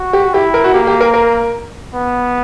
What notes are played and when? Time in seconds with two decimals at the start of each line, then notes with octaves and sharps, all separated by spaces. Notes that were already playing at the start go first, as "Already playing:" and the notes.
Already playing: F#4
0.13 G4
0.33 E4 G4
0.54 A#4
0.64 F#4
0.74 A#3 G4
0.87 G4
1.01 A#4
1.14 A#4
1.94 B3